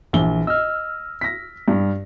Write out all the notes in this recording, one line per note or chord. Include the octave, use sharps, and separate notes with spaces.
A#1 E3 G7
D#5 E6 F6
A#6 B6
G2